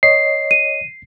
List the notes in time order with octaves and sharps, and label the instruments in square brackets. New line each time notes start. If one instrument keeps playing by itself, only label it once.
[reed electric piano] C#5 D#5 [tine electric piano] C7
[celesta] D#7